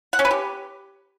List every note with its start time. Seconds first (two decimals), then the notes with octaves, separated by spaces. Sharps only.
0.13 F#5
0.19 C#4
0.25 B4
0.31 G4